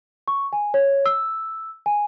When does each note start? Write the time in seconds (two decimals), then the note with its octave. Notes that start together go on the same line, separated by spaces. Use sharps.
0.28 C#6
0.53 G#5
0.74 C#5
1.06 E6
1.86 G#5